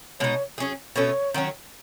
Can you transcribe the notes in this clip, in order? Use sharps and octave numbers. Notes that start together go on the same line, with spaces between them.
B2 G#3 D#4 C#5
F#3 C#4 G#4
B2 A3 C#4 C#5
D#3 F#3 C#4